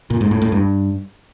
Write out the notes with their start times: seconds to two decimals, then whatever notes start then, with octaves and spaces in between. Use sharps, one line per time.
0.10 A#2
0.21 G#2
0.31 A2
0.42 A2
0.52 G2